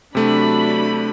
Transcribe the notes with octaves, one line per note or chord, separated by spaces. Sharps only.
C3 F#3 A3 D4 B5